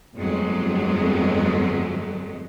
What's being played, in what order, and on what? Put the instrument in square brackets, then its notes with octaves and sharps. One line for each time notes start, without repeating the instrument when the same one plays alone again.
[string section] G1 F2 F#3 G#3 A3